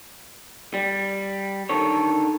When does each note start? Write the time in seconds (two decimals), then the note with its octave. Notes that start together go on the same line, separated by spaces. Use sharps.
0.74 G3
1.69 D3 D#3 A4 C#5